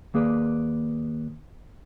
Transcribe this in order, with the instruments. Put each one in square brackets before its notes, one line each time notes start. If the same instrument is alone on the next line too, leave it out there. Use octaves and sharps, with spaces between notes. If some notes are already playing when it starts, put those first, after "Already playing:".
[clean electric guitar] D#2 A#3 G#4 B4 D5